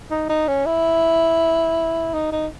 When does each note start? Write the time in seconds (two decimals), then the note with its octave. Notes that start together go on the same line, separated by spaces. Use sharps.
0.11 D#4
0.29 D#4
0.48 C#4
0.66 E4
2.14 D#4
2.32 D#4